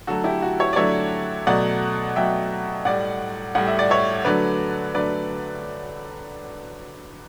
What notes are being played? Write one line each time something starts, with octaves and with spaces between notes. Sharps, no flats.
D3 F#3 A3 F#4 A4
E4 G4
F#4
C#5 E5
D5
D3 F#3 A3 C#5 E5
B2 F#3 A3 D5 F#5
B2 F#3 A3 E5 G5
A2 G3 D5 F#5
A2 G3 F#5
E5
D5
C#5 E5
D3 F#3 A3 B4 D5
D3 F#3 A3 B4 D5